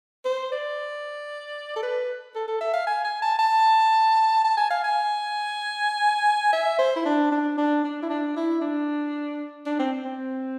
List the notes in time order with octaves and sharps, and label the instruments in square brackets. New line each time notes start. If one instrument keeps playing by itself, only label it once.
[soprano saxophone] C5
D5
A4
B4
A4
A4
E5
F5
G#5
G#5
A5
A5
A5
G#5
F5
G#5
E5
C5
E4
D4
D4
D4
D4
E4
D4
E4
D4
D4
C4
C4